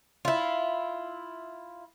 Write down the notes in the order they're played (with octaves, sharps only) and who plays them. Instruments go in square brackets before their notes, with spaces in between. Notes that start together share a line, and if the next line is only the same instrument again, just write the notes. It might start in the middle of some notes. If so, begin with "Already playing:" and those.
[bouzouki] E4 F4